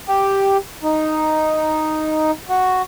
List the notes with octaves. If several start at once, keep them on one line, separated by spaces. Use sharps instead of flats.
G4
D#4
F#4